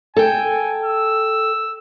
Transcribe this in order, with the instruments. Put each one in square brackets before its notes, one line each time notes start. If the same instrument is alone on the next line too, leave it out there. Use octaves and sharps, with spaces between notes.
[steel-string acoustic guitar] A4 G5 [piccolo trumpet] G#5
[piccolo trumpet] E6